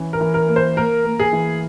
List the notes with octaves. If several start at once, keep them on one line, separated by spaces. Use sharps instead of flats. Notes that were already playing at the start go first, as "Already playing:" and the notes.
Already playing: E3 C#4
A#4
E3
A#4
A#3
C5
A#3 A#4
A#3
G#4
E3